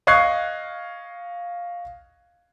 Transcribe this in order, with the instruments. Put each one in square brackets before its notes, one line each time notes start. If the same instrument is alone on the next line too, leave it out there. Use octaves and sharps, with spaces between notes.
[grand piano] D#5 F5 C#6 F#6 G#6 C7